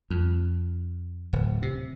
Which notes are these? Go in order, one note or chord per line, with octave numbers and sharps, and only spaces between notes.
F2
D1
C3